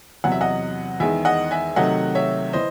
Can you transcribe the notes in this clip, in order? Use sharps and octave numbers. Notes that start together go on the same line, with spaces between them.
E2 C3 F#3 F#5
E5
D#5 F#5
E2 D#3 G#3 E5 G#5
D#5 F#5
E5 G#5
C3 D#3 F#3 A3 D#5 F#5
C#5 E5
E3 C5 D#5